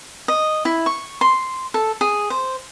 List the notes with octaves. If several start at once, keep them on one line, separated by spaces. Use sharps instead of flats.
D#5
E4
C#6
C6
A4
G#4
C5